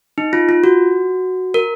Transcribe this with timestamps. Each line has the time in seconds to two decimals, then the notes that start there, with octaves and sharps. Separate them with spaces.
0.18 D#4
0.33 F4
0.49 F4
0.64 F#4
1.54 A#4